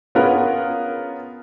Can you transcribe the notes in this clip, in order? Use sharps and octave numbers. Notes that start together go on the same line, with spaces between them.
B3 C#4 F4 G#4 A#4 B4